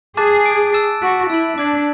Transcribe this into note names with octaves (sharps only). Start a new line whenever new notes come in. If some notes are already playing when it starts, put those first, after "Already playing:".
G#4 A5 D6 F#6 A6
D6 A6 D7
A5 E6 A6 E7
F#4 F#6 B6 D7
E4 E6 B6 D7 F#7
D4 D6 G#6 D7 F#7